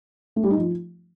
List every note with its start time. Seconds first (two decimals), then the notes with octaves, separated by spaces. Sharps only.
0.36 A3
0.43 G3
0.50 D#4
0.58 F3